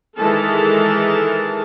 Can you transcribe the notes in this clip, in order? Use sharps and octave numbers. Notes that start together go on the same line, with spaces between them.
D#3 E3 G#3 A4 A#4 A5